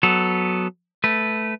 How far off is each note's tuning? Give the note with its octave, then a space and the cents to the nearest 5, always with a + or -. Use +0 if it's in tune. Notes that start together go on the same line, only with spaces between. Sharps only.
F#3 +0 B3 +0 A4 +0
A3 -10 B4 +0